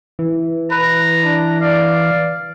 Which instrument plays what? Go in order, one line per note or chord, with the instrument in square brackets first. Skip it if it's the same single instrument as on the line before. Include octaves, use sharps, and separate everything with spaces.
[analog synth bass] E3
[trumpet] B4 [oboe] A#5
[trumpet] D4
[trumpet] D5 [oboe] F5